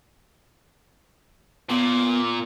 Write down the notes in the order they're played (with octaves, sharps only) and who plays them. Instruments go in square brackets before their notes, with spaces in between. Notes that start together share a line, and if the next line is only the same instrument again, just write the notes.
[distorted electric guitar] A#2 [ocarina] B3